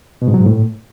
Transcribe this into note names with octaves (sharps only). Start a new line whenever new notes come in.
B2
G#2
F#3
G#2
A2